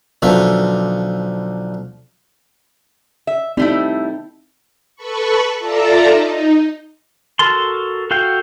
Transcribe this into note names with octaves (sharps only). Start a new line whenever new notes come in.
B1 D3 F3 E5
E5
G3 A3 C4 D#4 E4
A4 B4 A5 B5 C#6
F4 A4 D5 E5 A5 A#5
D#4
F#4 A4 A#4 A5 C6
F#4 A4 F5 G5